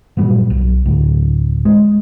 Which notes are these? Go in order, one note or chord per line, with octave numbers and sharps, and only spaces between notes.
G2 A#2 F#3 G3
B1
D1 D2 A2
G#3